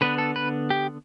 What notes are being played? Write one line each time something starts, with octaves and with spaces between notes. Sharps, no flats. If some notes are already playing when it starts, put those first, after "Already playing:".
D3 B3 D4 B4
A4
B4
G4